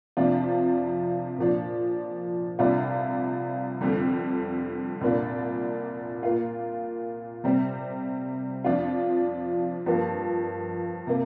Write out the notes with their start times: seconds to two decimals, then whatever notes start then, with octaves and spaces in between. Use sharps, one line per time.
0.17 F2 C3 F3 D4 F4
1.38 A#2 F3 D4
2.59 C2 C3 G3 D4 F4
3.81 F2 D3 G3
5.01 C2 A#2 A#3 D4
6.23 A#2 A#3 F4
7.44 C3 G3 C4
8.64 F2 F3 D4 F4
9.86 G2 F3 A#3
11.07 C3 A#3